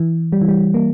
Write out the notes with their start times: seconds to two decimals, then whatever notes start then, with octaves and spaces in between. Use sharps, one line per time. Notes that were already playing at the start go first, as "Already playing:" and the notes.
Already playing: E3
0.32 G3
0.41 E3
0.49 G3
0.74 A#3